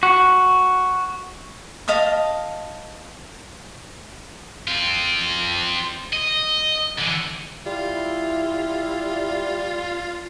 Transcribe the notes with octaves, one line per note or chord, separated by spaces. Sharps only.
F#4
D#5 F5 A5 D#6
C4 F4
D#5
D3 E3
G3 E4 F4